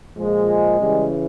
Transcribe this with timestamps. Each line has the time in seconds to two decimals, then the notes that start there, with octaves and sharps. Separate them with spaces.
0.17 A#2 F3 G#3
0.80 C#3 E3 G3